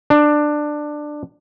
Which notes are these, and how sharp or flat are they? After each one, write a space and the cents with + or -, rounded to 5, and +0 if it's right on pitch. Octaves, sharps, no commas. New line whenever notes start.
D4 +15